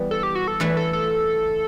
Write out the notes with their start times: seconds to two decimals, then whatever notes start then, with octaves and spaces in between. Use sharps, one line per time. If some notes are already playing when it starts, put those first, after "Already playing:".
Already playing: E3 G3 B3
0.11 A4
0.23 G4
0.35 F#4
0.48 A4
0.60 E3 A3 E4 B4
0.77 A4
0.93 A4